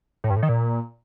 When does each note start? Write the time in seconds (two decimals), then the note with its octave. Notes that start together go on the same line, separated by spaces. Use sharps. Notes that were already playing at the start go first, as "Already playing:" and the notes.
0.24 A2
0.30 G2
0.36 A2
0.43 D#3
0.49 A#2